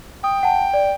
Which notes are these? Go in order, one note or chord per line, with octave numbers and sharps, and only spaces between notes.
G5 D#6
F#5 A5
D5